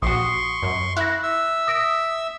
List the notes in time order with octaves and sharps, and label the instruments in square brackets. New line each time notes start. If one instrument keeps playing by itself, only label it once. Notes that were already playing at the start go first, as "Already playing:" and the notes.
[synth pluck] A#1 F#4 [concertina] C6 C#6 [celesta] D#6 C7
[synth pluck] F#2
[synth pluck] E4 [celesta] F#6 A#6
[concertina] E5 E6
[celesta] D#6 A#6 D7